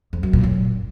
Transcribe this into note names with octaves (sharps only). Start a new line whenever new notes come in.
F2
F#2
A#2
F#2